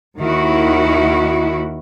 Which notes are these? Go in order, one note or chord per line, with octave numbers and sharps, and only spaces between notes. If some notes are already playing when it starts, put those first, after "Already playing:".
D#2 D#3 E4 F#4